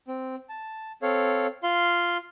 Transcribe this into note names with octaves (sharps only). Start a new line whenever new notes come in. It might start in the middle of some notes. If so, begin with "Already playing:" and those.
C4
A5
C4 A4 C#5 F5
F4 F5 C6